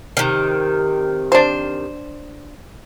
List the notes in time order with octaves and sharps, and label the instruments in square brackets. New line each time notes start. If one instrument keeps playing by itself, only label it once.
[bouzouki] C3 D#3
[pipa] D4 C5